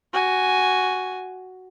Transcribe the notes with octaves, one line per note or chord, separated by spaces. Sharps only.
F#4 G#5